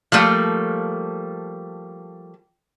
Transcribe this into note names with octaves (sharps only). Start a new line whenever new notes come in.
F3 G3 A3 A#3